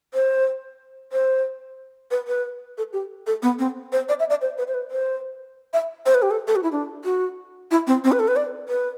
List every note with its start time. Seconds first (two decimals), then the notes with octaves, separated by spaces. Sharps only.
0.14 C5
1.12 C5
2.11 B4
2.28 B4
2.78 A4
2.93 G4
3.27 A4
3.42 B3
3.59 C4
3.92 C5
4.09 D5
4.20 E5
4.30 D5
4.41 C5
4.58 B4
4.68 C5
4.74 B4
4.91 C5
5.73 E5
6.06 C5
6.14 B4
6.22 G4
6.31 A4
6.47 A4
6.56 F#4
6.63 E4
6.72 D4
7.05 F#4
7.71 E4
7.87 C4
8.04 C4
8.12 B4
8.19 A4
8.28 B4
8.36 D5
8.69 B4